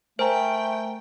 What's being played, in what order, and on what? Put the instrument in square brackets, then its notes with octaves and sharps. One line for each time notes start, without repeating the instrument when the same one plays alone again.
[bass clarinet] A3 [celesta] A#4 G#5 A#5 [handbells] C5 [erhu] G5